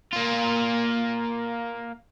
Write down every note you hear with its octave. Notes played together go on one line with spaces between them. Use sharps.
A#3 F4